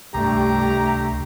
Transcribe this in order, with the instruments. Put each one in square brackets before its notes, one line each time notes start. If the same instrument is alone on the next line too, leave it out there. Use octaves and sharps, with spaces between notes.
[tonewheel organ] C#2 C3 [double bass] G2 A3 [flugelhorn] G4 [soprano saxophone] A#5